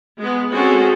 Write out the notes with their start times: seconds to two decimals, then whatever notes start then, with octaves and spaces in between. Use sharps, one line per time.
0.19 G#3 B3
0.54 G#3 C4 C#4 F#4 G#4 A4